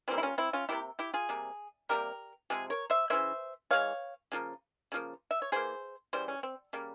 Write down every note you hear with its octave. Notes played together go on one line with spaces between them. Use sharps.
C3 E3 G3 A#3 C4 E4
E4
C#4 F4
C4 E4
C#4 F4
C3 G3 A#3 E4 G4
E4 G4
F4 G#4
C3 G3 A#3
C3 G3 A#3 G4 A#4
C3 F3 G#3 G#4
A#4 C#5
C5 E5
C#3 E3 A#3 C5 E5
E3 G#3 C#5 F5
C#3 F3 A#3
C#3 F3 A#3
E5
C#5
E3 A#3 G#4 C5
C#3 E3 G3 C5
C#4
C4
C#3 G3 A#3